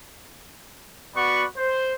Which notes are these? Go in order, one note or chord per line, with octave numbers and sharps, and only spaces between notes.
B3 F#4 D5 F#5 B5 C#6
C5